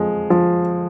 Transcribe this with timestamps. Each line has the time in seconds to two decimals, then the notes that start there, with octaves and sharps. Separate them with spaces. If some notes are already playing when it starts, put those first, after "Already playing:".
Already playing: F2 F3 G#3
0.30 F3